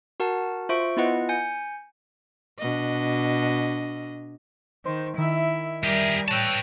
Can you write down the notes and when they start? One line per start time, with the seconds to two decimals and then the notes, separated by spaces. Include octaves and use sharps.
0.20 F#4 A#4 F#5 A5
0.69 F4 C5 E5 C#6 D7
0.97 B3 E4 F4 B4 D#5 F#5
1.29 G#5 G6 C#7
2.59 B2 D4 D#5
4.85 D#3 C5
5.18 D#3 E4 E5
5.84 G3 G4 G#4 A#4
6.28 B4 C#5 G5 A5 E6 A6